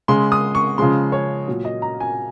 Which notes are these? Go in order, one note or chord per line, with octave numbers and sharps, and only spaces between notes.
C#3 G#3 C6
D#6
C#6
C#3 F3 G#3 C6
C#5
A#2 F#3
D#5
A#5
G#5